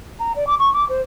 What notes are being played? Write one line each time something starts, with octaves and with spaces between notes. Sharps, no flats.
A#5
D5
D6
C#6
D6
C5